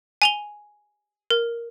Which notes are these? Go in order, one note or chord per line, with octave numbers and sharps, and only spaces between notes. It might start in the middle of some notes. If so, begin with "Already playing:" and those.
G#5 F7 G7
A#4